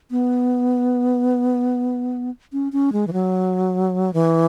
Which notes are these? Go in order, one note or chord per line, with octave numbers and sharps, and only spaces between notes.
B3
C#4
C#4
G#3
E3
F#3
E3